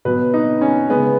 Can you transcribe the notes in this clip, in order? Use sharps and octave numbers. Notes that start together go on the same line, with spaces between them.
B2 F#3 B4
D#4
C#4
C#3 G#3 B3